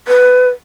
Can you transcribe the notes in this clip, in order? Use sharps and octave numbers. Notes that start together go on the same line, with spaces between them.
B4